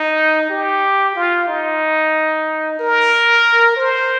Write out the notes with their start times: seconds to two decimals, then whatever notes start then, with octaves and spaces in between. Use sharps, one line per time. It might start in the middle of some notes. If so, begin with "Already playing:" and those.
Already playing: D#4
0.49 G4
1.16 F4
1.48 D#4
2.79 A#4
3.76 C5